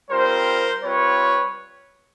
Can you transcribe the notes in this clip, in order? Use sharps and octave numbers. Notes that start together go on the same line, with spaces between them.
G3 C4 F4 A#4 C5
G3 C4 F4 B4 C#5